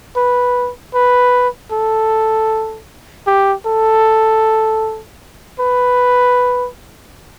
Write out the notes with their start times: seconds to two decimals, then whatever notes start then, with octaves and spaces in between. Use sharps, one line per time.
0.16 B4
0.94 B4
1.72 A4
3.27 G4
3.66 A4
5.60 B4